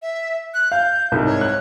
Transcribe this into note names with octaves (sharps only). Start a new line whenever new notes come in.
E5
F#6
F5 G6
C2 G#2
C#5
F#6